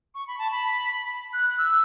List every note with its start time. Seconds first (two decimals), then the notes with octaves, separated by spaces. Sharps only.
0.15 C#6
0.27 B5
0.38 A5
0.51 B5
1.33 F#6
1.50 F#6
1.58 E6